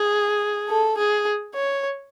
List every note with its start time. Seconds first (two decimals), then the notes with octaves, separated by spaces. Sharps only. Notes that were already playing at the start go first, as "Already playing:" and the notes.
Already playing: G#4
0.69 A4
0.98 G#4
1.55 C#5